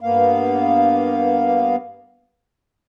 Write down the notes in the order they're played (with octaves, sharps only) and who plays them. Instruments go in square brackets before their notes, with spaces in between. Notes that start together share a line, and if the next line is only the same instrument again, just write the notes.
[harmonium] G2 A#3 B3 F5